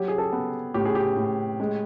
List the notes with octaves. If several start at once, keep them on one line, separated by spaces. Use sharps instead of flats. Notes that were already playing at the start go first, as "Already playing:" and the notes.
Already playing: F#3 G4
G#4
A4
B3
A2 G4
G#4
G4
A2
G#3